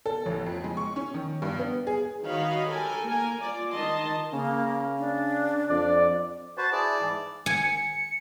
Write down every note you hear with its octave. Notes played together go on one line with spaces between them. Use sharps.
A4
A1
F2
G#3
C#6
C#4
D#3
G2
B3
G#4
D#3 F#4 C#5 D#5 F5 B5
G4 A4 A#4 G#5
A#3 A#4 G#5
F4 D5
D#3 D#5 A5 C6
C#3 A#3
D4
F2 D5
F#4 B4 C5 A5
E4 G#4 D5 A5
G#2 E3
G#5 C#7